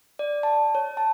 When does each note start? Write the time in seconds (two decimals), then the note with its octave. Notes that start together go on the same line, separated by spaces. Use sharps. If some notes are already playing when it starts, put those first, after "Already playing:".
0.19 D5
0.43 A5
0.75 C#5
0.97 A5